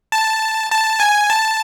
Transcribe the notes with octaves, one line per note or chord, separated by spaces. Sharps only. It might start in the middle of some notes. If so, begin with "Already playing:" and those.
A5
A5
G#5
A5